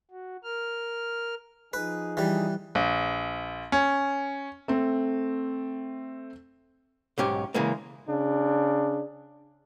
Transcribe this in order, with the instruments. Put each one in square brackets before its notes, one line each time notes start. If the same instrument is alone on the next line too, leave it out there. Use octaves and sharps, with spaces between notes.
[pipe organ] F#4
A#4 F6
[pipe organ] F3 D#4 G#4 [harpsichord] B4
[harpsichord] E3 G3
[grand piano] A#1
C#4
[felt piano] A3 C4
[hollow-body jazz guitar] B1 G#2 C#4 G4
C#3 E3 G#3 A#3
[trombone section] C#3 D4